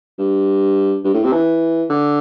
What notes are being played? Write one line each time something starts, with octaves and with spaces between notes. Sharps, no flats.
G2
G2
A2
C3
E3
D3